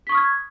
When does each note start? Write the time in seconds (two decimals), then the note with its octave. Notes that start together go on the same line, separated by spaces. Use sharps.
0.07 B6
0.09 C#6
0.12 D#6
0.15 F6
0.17 G#6